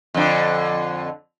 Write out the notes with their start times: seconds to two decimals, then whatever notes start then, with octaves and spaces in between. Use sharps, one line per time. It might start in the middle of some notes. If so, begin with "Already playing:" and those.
0.14 F2 D3